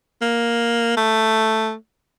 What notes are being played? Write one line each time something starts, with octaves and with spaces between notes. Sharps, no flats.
A#3
A3